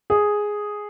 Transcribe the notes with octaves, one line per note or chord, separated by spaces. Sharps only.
G#4